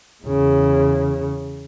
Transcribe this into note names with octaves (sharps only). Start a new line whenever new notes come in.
E2 C#3